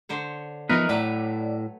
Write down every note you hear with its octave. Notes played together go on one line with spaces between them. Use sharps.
D3 C5 C#5
E3 F3 B3 D#4 A#4 B4 C#5
A2 F#3 A3 B4 D5